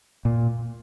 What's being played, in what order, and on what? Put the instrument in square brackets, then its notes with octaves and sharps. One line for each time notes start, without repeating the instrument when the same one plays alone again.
[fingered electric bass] A#2